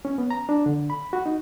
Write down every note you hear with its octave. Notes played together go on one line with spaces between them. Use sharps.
C#4
B3
A#5
D4
D3
B5
F#4
D#4